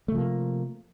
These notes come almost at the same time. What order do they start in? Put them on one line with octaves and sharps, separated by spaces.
A3 C3 F3 A#3